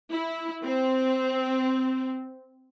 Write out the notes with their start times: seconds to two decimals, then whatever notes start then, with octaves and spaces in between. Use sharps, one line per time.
0.11 E4
0.64 C4